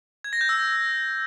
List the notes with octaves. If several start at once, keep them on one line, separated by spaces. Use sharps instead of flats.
G#6
A#6
G6
E6